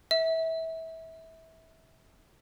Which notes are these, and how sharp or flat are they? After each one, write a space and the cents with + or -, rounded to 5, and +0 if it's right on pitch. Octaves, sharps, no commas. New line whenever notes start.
E5 -25